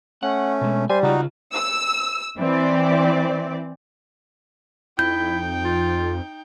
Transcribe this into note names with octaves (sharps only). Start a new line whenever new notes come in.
A3 C#4 F#5
B2 G#3
G3 C5 G#5
C#3 D#4 F4 F#4
E6
E3 C4 D5
F2 D#4 E4 G5 G6
F4